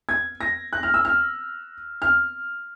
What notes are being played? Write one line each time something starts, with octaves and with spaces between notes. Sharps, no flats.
G#6
A#6
F#6
F6
E6
F6
F6